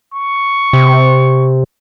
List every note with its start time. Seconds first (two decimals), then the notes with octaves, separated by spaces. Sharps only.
0.14 C#6
0.73 C3